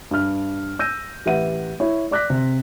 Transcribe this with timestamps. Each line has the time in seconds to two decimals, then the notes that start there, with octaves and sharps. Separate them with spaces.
0.11 G2 F6
0.79 E6 G6 A#6 D#7
1.26 A1 G4 B4 E5 F#5 D#7
1.80 E4 C#5
2.11 D5 D6 F#6 A#6 B6
2.30 C3